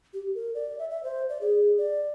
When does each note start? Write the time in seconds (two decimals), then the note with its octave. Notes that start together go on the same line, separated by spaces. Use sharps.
0.14 G4
0.35 A#4
0.55 D5
0.79 E5
0.90 E5
1.03 C5
1.29 D5
1.41 G#4
1.78 D5